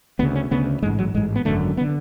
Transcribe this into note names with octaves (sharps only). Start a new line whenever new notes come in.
D2 C#3 B3
C#4
D2 C#3 B3
A1 G#2 G#3
F#3
A1 G#2 G#3
B3
G#1 F#2 D3 A3
B3
D3